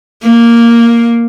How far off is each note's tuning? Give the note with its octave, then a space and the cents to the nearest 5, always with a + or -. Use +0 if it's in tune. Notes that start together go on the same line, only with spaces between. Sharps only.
A#3 +0